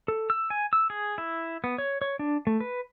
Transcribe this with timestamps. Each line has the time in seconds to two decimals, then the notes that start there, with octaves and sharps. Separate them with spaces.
0.08 A4
0.30 E6
0.50 G#5
0.73 E6
0.90 G#4
1.18 E4
1.64 B3
1.78 C#5
2.02 C#5
2.19 D4
2.47 A3
2.60 B4